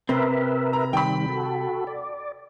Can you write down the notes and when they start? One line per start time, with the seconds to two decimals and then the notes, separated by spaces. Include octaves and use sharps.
0.09 C3 C4 A#4 B4 E5
0.73 A#5
0.93 D#3 G3 G5 B5
1.29 F#4 A4
1.87 D5